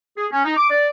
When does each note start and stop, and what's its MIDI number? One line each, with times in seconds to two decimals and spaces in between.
0.16 0.26 68
0.31 0.44 61
0.45 0.56 63
0.57 0.68 86
0.70 0.89 74